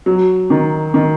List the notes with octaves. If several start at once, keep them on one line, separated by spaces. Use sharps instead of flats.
F#3
D#3
D#3